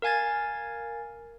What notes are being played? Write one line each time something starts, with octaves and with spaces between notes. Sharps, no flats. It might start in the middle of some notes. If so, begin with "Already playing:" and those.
A#4 F5 G#5 G#6 A6